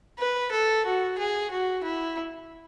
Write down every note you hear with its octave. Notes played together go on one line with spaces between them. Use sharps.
B4
A4
F#4
G#4
F#4
E4